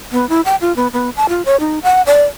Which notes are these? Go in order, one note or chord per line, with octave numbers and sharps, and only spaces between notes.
B3
E4
G5
F4
B3
B3
A5
F4
C#5
D#4
F#5
D5